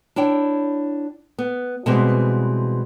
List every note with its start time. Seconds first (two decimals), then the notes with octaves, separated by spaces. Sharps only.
0.16 D4 E4 C#5 G5
1.38 B3
1.86 B2 E3 G3 G#3 C4 F#4